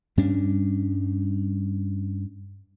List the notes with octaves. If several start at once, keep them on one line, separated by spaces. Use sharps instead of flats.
G2 G3 C#4 D4